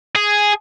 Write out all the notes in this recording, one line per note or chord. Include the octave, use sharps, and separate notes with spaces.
G#4